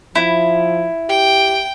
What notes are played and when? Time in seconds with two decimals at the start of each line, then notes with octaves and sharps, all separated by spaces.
0.15 F3 E4
1.09 G4 G5